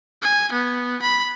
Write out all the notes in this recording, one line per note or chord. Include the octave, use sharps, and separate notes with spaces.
G#5
B3
B5